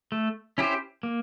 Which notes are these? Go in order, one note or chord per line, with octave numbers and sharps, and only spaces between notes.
A3
C#4 E4 G4 C5
A#3